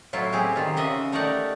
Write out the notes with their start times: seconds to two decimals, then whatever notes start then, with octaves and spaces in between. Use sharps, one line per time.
0.13 A2 F#3 E4 F4
0.33 C4 G4 G#4
0.56 D#3 F4
0.77 C#3 D#5 E5 F#5
1.12 A3 D#4 G4 A#4 D5 F#5